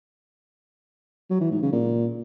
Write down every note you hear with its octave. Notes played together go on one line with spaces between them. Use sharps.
F#3
E3
G#2
C#3
A#2